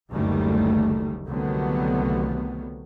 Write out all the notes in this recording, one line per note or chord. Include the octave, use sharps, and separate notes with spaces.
F#1 D2 D#3 G3 A3
C2 D3 D#3 F#3 A3 B3